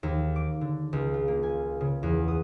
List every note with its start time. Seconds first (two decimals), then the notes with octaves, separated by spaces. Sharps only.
0.03 D#2
0.36 D6
0.61 D3
0.93 C#2
1.14 F4
1.28 A#3
1.43 G#5
1.81 C#3
2.03 E2
2.28 D#6